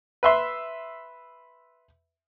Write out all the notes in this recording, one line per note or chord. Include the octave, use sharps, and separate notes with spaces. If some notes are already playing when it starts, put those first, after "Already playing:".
B4 E5 C6